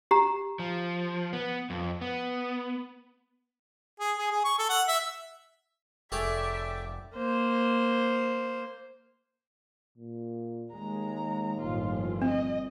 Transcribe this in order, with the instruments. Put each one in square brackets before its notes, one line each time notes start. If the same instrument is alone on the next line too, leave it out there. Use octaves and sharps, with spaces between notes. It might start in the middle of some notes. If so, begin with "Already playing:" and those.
[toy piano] G4 A#5
[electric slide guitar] F3
B3
F2
B3
[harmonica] G#4
G#4
G#4
C#6
A4
F#5
E5
[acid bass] F1 [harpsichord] G#4 A4 C#5 [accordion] D5 G5 D6 [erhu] E5
[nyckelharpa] A#3 C5
[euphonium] A#2
[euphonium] D#2 [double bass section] G#3 [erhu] A#5
[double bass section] G1 A2 F3 [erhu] F4
[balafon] C4 [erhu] D#5